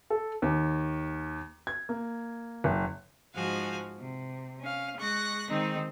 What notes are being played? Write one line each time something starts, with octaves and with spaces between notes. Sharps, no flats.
A4
D#2
G#6
A#3
F#1
G#2 F3 F#4 F5 G#5
C3
C#4 F5
G#3 C#6 F#6 A#6
D#3 G#3 C4 D#4